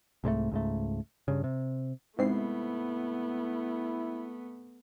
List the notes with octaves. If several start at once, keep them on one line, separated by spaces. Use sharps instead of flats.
C2 G#2 G#3 A3
C#2 G#2 A3
G2 C#3
C3
G#2 C3 A3 B3 E4 C7